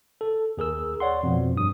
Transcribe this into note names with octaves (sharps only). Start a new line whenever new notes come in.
A4
D#2 G#4 A#4 E6
C#5 D5 F#5 C6
F2 B2 F3
G2 D#6